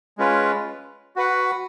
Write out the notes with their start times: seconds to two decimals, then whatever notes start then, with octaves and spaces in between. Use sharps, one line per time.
0.18 G#3 C#4 F4 B4
1.16 F#4 B4 F#5